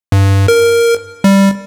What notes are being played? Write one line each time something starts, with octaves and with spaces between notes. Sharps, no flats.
G2
A#4
G3